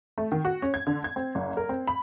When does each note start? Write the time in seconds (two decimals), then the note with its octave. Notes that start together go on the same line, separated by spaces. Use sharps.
0.18 A3
0.32 D#3
0.45 F#4
0.62 C#4
0.74 G#6
0.87 D3
1.04 G#6
1.16 C4
1.35 F#1
1.57 A#4
1.69 C4
1.87 B5